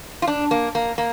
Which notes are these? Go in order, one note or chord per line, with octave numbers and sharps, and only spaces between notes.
F4
D4
A#3
A#3
A#3